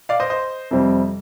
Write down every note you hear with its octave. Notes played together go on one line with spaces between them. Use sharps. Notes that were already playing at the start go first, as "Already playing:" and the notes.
D5 F5
C5 D#5
C5 D#5
F2 C3 G3 C4